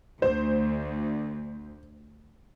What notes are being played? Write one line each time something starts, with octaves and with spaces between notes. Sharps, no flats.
D2 C5